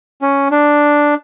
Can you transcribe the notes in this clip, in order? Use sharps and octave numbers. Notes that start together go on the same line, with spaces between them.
C#4
D4